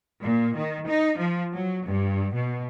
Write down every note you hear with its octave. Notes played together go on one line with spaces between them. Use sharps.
A#2
D#3
D#4
F3
F#3
G2
B2